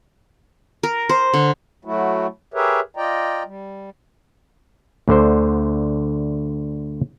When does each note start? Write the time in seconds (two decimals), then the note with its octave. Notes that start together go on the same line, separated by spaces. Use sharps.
0.83 A#4
1.09 C5
1.34 D3
1.85 F#3 A3 E4 F#4
2.54 G4 G#4 A#4 B4 C#5 E5
2.96 F4 D5 D#5 G5 A#5
3.45 G3
5.08 D2 D3 C5